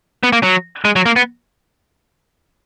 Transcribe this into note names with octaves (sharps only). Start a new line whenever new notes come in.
B3
A#3
F#3
G#3
F#3
A#3
B3